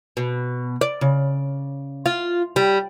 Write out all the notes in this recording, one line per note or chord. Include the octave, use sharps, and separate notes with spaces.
B2
D5
C#3
F4
G3